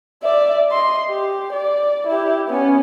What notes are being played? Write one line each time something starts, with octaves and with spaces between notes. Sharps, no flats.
D5 E5
D#5 C6
G4
D5
E4 G4
B3 C#4